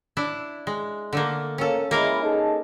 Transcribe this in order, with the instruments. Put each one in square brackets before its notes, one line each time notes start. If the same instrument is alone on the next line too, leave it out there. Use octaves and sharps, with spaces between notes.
[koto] D4 E4
G#3
D3 A3 A#3
[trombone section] A#3 [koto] C#4 A4
[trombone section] G#3 E4 [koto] A#3 A#4 F5
[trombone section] D#4 G#4 A4